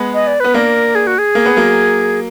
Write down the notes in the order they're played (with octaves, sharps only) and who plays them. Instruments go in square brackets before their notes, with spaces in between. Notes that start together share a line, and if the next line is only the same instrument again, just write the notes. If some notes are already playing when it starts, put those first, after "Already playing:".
Already playing: [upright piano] G#3 B3
[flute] D#5
D5
[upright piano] B3 [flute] B4
[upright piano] A#3 D4 [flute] A#4
[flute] G#4
F#4
G#4
[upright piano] A#3
B3
F#3 A#3